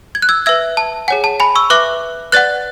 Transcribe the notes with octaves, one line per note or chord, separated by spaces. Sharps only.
G#6
F#6
E6 G#6
B4 E5 E6 G#6
A5
G#4 C#5 F#5 G#5
A5
G#5 B5
C#6 E6
B4 E5 D6 F#6
B4 D5 F#5 F#6 A6